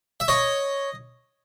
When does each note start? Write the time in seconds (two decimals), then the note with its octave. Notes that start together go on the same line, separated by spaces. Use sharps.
0.20 E5
0.28 C#5 D#5